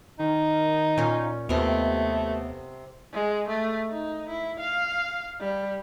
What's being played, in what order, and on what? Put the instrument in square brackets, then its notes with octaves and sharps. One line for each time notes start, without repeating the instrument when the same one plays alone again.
[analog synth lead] D#3 [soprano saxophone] D#4
[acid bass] A#2 [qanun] C#4 F4
[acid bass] D#2 [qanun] C3 A#4 [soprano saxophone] A3 [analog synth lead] B3
[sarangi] G#3
A3
D#4
E4
F5
G3